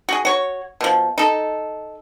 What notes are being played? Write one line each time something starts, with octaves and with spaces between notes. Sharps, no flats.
F#4 G#4
F#4 C#5
B2 F3
D#4 A4